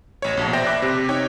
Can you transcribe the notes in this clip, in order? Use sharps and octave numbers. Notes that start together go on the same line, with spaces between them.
A1 C#5
A#1 B2 A5
C5 D5 E5 G5 A#6
E5 B5 D6 F#6
C3
D#4 C#5 G5